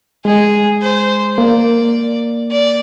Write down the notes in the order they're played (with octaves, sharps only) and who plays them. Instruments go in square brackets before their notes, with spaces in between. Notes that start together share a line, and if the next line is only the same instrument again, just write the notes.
[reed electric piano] G#3 [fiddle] G#4
[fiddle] C5
[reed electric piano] A#3 [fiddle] D5
[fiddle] D5